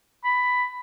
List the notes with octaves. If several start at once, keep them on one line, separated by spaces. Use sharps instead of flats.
B5